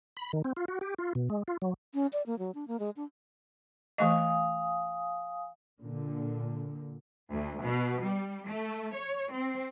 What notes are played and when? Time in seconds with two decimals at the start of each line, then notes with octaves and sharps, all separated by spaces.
0.17 B5
0.33 D#3
0.44 C4
0.57 F4
0.68 F#4
0.81 G4
0.98 F4
1.15 B2
1.30 G#3
1.48 F4
1.62 F#3
1.94 C#4
2.13 D5
2.26 A#3
2.39 F#3
2.55 D4
2.68 A#3
2.80 G#3
2.96 D4
3.98 E3 A3 D#5 F5 G#5 D#6
5.80 A#2 D3
7.31 D2
7.63 B2
8.04 G3
8.47 A3
8.94 C#5
9.32 C4